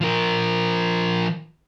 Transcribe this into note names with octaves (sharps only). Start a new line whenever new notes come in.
F3 A#4